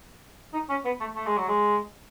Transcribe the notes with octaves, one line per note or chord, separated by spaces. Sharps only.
D#4
C#4
B3
A3
A3
G#3
F#3
G#3